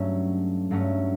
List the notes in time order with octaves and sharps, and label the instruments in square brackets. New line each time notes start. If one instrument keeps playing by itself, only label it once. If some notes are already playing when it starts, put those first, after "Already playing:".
Already playing: [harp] G2 F#3 A3 C#4
G2 F#3 A3 C#4